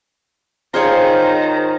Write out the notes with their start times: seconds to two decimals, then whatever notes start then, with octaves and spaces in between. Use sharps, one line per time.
0.74 D#3 F4 G#4 C5 C#5 A#5